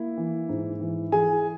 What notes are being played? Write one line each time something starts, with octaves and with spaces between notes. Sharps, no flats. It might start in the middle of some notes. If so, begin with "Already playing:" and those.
Already playing: A#3 E4
E3
G#2
E3
E3 G#4 G#5